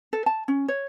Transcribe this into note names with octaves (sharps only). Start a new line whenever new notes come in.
A4
A5
C#4
C#5